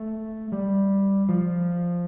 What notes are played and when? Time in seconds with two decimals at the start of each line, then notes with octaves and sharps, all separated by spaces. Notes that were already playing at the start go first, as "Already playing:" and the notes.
Already playing: A3
0.52 G3
1.29 F3